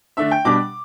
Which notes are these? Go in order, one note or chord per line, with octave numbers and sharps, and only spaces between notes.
D3 A3 D4 E5
G5
B2 G3 D4 D6